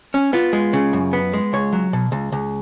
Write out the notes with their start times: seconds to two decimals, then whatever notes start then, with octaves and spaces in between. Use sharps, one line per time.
0.14 C#4
0.33 B3 F4
0.53 G#3
0.73 C#3
0.93 F#2
1.13 B3
1.33 G#3
1.53 C#2 C#5
1.73 F#3
1.93 B2
2.12 C#2
2.32 C#2